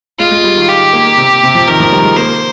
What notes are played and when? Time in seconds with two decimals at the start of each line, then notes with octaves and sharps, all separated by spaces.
0.19 G#3 F4
0.32 G#3
0.44 G3
0.56 D#3
0.69 G4
0.93 A#3
1.17 C3
1.43 C3
1.55 F3
1.68 D#3 A#4
1.80 F3
1.92 G3
2.04 G#3
2.16 A#3 C5